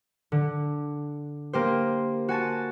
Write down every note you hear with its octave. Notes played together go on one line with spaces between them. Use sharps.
D3
A#3 G4 C5
F#4 G#5 A5